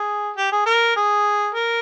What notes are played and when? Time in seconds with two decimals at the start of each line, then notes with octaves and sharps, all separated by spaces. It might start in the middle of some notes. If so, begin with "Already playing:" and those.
Already playing: G#4
0.37 G4
0.52 G#4
0.66 A#4
0.96 G#4
1.55 A#4